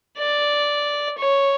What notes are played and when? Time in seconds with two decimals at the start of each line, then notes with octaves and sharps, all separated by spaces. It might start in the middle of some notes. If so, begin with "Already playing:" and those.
0.18 D5
1.18 C#5